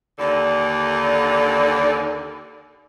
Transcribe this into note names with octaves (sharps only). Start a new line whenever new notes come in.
D#2 D3